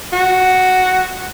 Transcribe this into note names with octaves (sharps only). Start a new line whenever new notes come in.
F#4